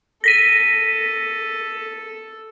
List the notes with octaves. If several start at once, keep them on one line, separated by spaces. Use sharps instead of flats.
A4 A#6 B6 D#7